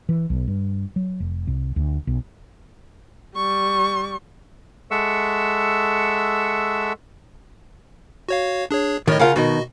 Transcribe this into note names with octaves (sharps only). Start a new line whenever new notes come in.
E3
B1
G2
F#3
F1
C2
D2
B1
G3 C#6
G#3 A4 E5 F#5 C#6 E6
F#4 C#5 F5
D4 G#4 C#5
A2 D#3 A#4 C#5 D#5
C#3 F4 A#4 F5 F#5
B2 D#3 F#4 D#5